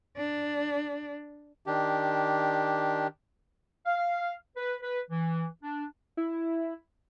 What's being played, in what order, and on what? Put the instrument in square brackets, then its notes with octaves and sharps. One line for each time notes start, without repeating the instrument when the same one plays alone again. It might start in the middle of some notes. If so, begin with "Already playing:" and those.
[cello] D4
[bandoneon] D#3 D4 G4
[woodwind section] F5
B4
B4
E3
D4
[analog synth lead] E4